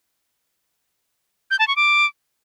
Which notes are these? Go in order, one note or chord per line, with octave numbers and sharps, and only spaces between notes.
G6
A5
C#6
D6